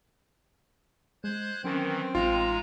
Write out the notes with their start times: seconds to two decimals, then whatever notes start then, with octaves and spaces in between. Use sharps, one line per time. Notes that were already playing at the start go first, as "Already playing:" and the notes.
1.24 G#3 C5 F#6 G#6
1.64 D#3 E3 F#3 C4 C#4 A#4
2.15 A1 G#3 D#4 F4 A#5